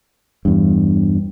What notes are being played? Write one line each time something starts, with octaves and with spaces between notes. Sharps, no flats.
E2 G2